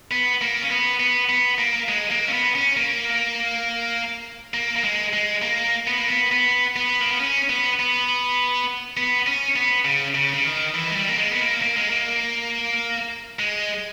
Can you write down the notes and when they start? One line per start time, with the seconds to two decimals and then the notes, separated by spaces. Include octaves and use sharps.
0.11 B3
0.41 A#3
0.61 C#4
0.71 B3
1.00 B3
1.29 B3
1.59 A#3
1.89 G#3
2.11 A#3
2.28 C#4
2.33 B3
2.55 C#4
2.77 A#3
4.54 A#3
4.76 A#3
4.84 G#3
5.13 G#3
5.42 A#3
5.87 B3
5.97 A#3
6.08 B3
6.32 B3
6.76 B3
7.01 A#3
7.11 B3
7.20 C#4
7.49 B3
7.79 B3
8.97 B3
9.27 C#4
9.56 B3
9.85 C#3
10.14 C#3
10.34 C#3
10.44 D#3
10.74 E3
10.90 G#3
10.96 G3
11.10 A#3
11.18 G#3
11.31 B3
11.40 A#3
11.62 A#3
11.77 G#3
11.90 A#3
13.39 G#3